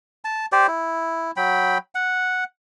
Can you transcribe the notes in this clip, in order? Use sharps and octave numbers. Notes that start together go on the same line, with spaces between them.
A5
G4 C5 D5
E4
F#3 G5 B5
F#5